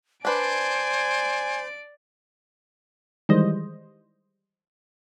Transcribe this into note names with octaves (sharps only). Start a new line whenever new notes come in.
D4 B4 C5 D5 G#5 D7
D#3 E3 G3 G#3 C5 D#5